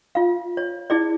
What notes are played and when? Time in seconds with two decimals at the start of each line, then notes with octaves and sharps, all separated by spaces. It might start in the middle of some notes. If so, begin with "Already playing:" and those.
0.15 F4 F5
0.57 C#5
0.90 E4 G#4 D5